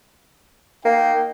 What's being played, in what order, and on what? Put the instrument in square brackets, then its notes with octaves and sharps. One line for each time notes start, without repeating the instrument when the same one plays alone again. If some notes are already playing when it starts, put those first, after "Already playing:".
[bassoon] A#3 [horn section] D#4 G5